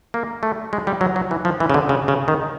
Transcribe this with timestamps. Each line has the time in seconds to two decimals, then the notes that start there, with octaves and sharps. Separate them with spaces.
0.14 A#3
0.43 A3
0.73 G#3
0.87 G3
1.01 F#3
1.16 F#3
1.31 E3
1.45 F3
1.60 E3
1.70 C#3
1.74 D3
1.89 C#3
2.08 C#3
2.28 D#3